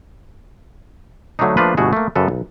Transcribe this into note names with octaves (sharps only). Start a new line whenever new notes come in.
D3 F#3 A3 C4 D4 D#4
F3 A3 A#3 D4 F4 B4
G1 B2 A3 F#4 G#4
A3 A#3
F#2 C#3 A4 B4
B1